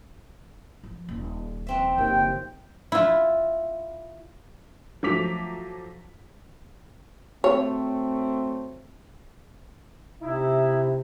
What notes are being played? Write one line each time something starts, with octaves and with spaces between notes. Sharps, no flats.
F3
D#1
F2 C4 E5
F#1 D#2 G5
E4 F4
F3 F#3 A3 D6 B6 F7
F#3 A3 C4 C#5
C3 D#4 E4